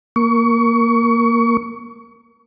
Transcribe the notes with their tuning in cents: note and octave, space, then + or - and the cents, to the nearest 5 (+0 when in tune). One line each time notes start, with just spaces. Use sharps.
A#3 +0 C#6 +30